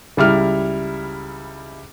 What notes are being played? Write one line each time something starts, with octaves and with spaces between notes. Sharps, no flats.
C#2 G3 E4 F6